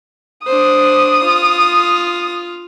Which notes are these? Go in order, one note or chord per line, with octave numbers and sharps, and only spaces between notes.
D4 C5 D#6
F4